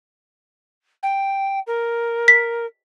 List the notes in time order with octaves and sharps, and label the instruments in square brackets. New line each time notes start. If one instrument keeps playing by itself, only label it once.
[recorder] G5
A#4
[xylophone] B6